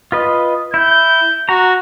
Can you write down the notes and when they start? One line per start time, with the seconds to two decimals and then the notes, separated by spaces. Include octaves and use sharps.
0.12 F4 B4 D#5
0.74 E4 G6
1.49 F#4 A#5